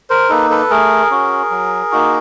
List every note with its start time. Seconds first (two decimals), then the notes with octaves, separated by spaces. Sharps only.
0.10 A#4 C5
0.29 A#3 D#4 A4 B4
0.50 A4 B4
0.70 A3 G#4 A#4
1.10 C#4 F#4
1.51 F#3
1.92 A#3 D#4 F#4